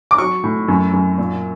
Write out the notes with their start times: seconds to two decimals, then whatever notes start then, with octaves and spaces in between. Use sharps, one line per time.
0.11 D6
0.18 F#3 C#6
0.44 A2
0.68 F#2
0.93 F#2
1.18 A#2